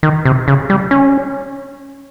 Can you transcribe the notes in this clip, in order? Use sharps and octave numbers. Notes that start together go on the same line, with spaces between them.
D#3
C3
C#3
G3
C#4